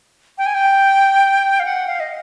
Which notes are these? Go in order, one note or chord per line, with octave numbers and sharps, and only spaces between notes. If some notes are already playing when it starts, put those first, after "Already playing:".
G5
G#5
G5
F5
F#5
F5
D#5